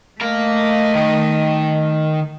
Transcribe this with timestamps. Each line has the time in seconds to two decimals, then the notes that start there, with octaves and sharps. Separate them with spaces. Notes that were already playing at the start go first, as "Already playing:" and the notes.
0.21 A3 A#4 D#5 F5
0.95 D#3